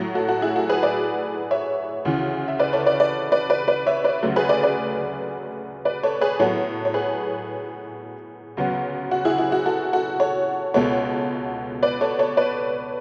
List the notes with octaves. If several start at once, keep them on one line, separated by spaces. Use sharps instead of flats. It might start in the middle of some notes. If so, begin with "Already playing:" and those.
Already playing: A2 F#3 A3
F#4 A4
F#4 A4
E4 G#4
F#4 A4
G#4 B4
B4 D5
C#5 E5
D2 C#3 E3
E5
B4 D5
A4 C#5
B4 D5
B4 D5
B4 D5
B4 D5
B4 D5
C#5 E5
B4 D5
D2 C#3 F#3 A3
G#4 B4
B4 D5
B4 D5
B4 D5
A4 C#5
G#4 B4
A2 F#3 B3 A4 C#5
C#5
G#4 B4
D2 C#3 F#3 B3
F#4
E4 G#4
E4
F#4
F#4 A4
F#4 A4
A4 C#5
C#2 B2 G#3 B3 A4 C#5
B4 D5
A4 C#5
A4 C#5
B4 D5